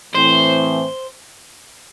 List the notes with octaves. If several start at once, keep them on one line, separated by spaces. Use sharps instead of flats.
A2 E3 C4 C5